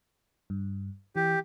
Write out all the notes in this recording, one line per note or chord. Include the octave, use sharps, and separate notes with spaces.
G2
E3 G4